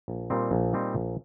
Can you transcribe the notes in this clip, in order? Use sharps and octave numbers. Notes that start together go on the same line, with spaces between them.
A#1
A#2 G3 C4 D#4
A#1
A#2 G3 C4 D#4
A#1